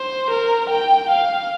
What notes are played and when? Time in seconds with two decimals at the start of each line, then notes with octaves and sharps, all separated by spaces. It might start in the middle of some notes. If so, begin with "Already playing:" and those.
Already playing: C5
0.30 A#4
0.70 G5
1.09 F5